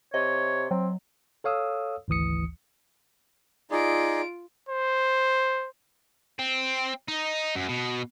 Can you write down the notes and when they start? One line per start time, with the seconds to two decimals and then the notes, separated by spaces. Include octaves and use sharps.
0.14 C3 C#5 D#5
0.71 F#3 C4
1.44 A4 C#5 F5 D#6 E6
2.08 G#1 D2 E3 D#6 C#7
3.71 D#4 F4 G#4 D5 D7
4.69 C5
6.39 C4
7.08 D#4
7.55 F#2
7.69 B2